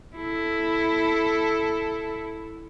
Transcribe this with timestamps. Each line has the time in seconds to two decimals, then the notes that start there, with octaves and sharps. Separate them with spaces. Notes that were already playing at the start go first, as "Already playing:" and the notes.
0.16 E4 A4